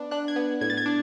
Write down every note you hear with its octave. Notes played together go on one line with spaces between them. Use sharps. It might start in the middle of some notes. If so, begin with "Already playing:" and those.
Already playing: B3 D4
D4 F#6
G#6
B3
A2 G#6
A6
G#6
D4